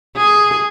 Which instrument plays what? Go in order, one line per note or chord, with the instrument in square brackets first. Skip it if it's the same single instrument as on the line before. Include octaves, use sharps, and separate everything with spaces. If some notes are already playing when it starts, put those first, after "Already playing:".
[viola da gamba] G#4